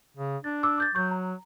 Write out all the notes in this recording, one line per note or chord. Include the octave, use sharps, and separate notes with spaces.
C#3
D4 A6
D6 E6
D6 G6 A6
F#3 C#6 G6
A#5